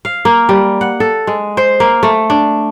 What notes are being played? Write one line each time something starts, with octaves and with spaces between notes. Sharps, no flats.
F5
A#3
G3
F#5
A4
G#3
C5
A#3
A3
D4